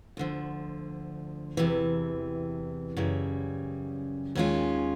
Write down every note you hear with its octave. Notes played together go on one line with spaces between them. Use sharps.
D2 D3 F3
E2 C3 E3
F#2 C#3 E3 G3
D#2 D#3 G#3 C#4 F4